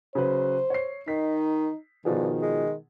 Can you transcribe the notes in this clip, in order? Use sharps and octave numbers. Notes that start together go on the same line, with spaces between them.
C#3 F#3 B4 C5
C#5 C7
D#3 D#4 B6
G2 B2 D#3 F3 G#4
G#3